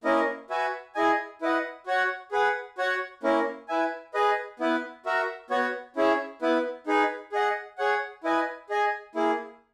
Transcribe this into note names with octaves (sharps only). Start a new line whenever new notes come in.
A#3 C#4 E4 A#4 D#5
F#4 B4 E5 G#5
E4 G#4 D#5 G#5
E4 B4 D#5 F#5
F#4 C#5 F#5
G#4 B4 F#5
F#4 C#5 F#5
A#3 C#4 E4 A#4
E4 B4 E5 G#5
G#4 B4 D#5
B3 E4 B4
F#4 A#4 E5
B3 F#4 C#5
C#4 E4 G#4 C#5 E5
B3 E4 B4
D#4 G#4 B4
G#4 D#5 F#5
G#4 C#5 F#5
E4 B4 D#5 G#5
G#4 D#5 G#5
A#3 E4 G#4